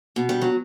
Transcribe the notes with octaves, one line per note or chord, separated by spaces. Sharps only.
B2
G3
F#3